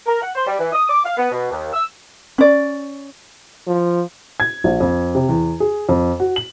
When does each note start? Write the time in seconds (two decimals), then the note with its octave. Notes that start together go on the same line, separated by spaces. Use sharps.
0.06 A#4
0.22 F#5
0.35 C5
0.47 G3
0.59 E3
0.73 D#6
0.89 D6
1.05 F5
1.17 B3
1.31 B2
1.51 D#2
1.73 E6
2.38 C#4 D5
3.68 F3
4.40 G#6
4.64 A#1
4.80 F2
5.15 C3
5.29 E2
5.60 G#4
5.89 F2
6.20 F#4
6.36 F#7